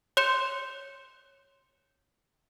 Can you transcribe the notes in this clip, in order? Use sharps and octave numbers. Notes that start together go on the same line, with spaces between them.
C#5 C6 G6 C#7 E7